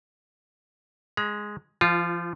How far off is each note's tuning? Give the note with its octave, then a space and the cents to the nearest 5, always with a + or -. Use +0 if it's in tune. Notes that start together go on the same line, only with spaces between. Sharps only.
G#3 +0 A#5 +45
F3 -30 F4 +0